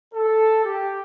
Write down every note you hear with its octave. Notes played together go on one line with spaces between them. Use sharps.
A4
G4